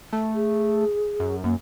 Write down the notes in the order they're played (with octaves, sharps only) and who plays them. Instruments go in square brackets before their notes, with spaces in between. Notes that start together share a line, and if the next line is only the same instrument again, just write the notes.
[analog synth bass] A3
[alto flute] G#4
[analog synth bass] F#2
[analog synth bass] F#2 [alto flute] A#3